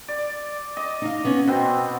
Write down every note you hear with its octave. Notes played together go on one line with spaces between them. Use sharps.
D5
D#5 D6
D#4 F5
B3 C#4
B2 B3 C4 C5